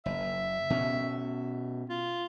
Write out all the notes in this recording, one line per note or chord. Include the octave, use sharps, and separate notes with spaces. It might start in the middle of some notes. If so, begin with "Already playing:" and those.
F#1 E5
B2 C#4
F4